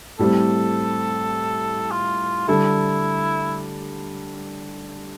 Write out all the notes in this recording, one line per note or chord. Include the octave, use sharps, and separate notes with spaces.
A2 G3 C4 G4 A4
F4
D3 G3 D4 E4 A4